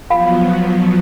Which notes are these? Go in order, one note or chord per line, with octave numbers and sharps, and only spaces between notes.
F3 F#3 B3 F4 F5 B5